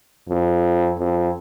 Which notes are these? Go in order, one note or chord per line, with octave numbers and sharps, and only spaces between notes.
F2
F2